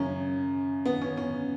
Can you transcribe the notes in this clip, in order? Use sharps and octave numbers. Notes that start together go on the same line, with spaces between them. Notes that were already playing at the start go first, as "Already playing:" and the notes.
Already playing: F#2 C#3 C#4
B3
C#4
C#4